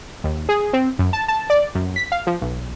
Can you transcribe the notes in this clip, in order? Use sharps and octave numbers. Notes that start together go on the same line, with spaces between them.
D#2
G#4
C4
F#2
A5
A5
D5
F#2
B6
F5
F3
B1